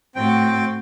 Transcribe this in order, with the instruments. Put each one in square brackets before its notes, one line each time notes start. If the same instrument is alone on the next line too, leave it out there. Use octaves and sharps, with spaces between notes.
[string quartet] A2 F#4 A6 [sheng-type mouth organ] C4 G5